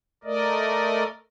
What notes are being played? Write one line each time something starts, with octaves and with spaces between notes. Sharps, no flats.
A3 A#4 D5 D#5